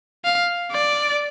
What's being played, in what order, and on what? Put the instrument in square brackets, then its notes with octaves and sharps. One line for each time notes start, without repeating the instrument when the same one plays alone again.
[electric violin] F5
D5